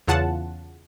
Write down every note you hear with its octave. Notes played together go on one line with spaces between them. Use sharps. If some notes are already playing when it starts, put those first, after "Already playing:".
E2 C#3 F4 F#5 A5